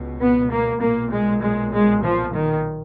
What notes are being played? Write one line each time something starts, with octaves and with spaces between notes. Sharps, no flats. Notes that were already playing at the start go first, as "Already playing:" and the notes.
Already playing: C#2 B2
B3
A#3
B1 A#2 A#3
G#3
G#3
G#3
F3
D#3